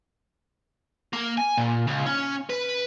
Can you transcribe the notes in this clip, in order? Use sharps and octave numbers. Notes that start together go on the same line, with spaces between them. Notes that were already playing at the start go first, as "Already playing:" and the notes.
A#3
G#5
A#2
C#2
C#4
B4